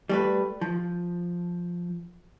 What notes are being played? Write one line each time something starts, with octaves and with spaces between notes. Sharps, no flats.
G3 A3 B4
F3